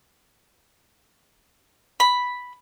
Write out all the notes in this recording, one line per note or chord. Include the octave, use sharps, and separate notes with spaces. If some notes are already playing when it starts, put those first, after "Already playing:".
B5